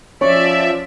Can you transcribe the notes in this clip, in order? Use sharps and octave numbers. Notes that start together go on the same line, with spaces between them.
F3 C#4 C#5 D5 E5 C#6